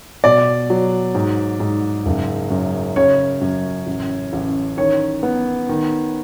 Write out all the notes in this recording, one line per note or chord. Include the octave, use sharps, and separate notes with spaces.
B2 D5
F#3
G#2
G#2
F#1
F#2
C#3 C#5
F#2
A1
A1
D#3 C#5
B3
D#3